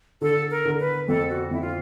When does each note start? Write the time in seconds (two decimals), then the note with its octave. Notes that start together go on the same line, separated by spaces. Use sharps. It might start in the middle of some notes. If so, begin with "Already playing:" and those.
0.21 D3 A4
0.51 A#4
0.65 D3
0.80 B4
1.08 F2 A4
1.30 F#4
1.51 F2 E4
1.61 F4